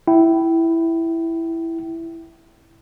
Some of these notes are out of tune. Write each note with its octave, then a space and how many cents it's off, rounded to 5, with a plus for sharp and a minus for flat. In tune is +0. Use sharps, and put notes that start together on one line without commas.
E4 +0 G5 -25